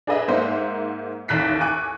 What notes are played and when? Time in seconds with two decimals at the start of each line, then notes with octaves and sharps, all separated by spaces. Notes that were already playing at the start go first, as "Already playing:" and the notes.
0.07 D4 G#4 B4 D#5 E5
0.28 G#2 A#3 C5 E5 F#5
1.28 A1 D#2 F#6 B6 C7
1.61 G#5 C#6 D6 F#6